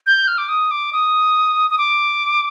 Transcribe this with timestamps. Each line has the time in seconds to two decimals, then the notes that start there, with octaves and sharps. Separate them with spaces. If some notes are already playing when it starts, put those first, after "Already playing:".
0.06 G6
0.28 F6
0.38 D6
0.49 D#6
0.71 D6
0.93 D#6
1.70 D#6
1.78 D6